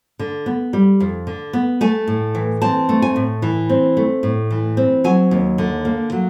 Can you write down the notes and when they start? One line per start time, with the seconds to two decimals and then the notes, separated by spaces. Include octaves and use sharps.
0.19 D3
0.46 B3
0.73 G3
1.00 F2
1.27 D3
1.53 B3
1.81 A3 G#5
2.07 A2
2.35 E3
2.62 C4 A5
2.89 A3
3.02 G#5
3.16 A2
3.42 E3
3.69 C4
3.97 A3
4.23 A2
4.51 E3
4.77 C4
5.04 F#3 G#5
5.31 D#2
5.58 D3
5.85 A#3
6.12 F#3